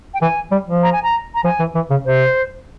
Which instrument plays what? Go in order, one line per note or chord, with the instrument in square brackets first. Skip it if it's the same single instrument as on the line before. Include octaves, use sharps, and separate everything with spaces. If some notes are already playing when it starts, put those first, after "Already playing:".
[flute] G5
[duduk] E3 [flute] G#5
[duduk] G3
F3
[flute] A#5
G#5
A#5
A#5
[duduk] F3 [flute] G#5
[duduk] E3
E3
C#3
[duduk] C3 [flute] C5